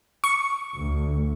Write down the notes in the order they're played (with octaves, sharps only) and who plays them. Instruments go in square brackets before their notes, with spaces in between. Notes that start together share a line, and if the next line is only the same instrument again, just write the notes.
[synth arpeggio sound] C#6
[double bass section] D2